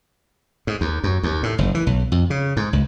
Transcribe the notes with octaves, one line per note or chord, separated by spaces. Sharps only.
G#2
D#2
F#2
D#2
A2
F#1
E3
B1
F2
C#3
G#2
C#2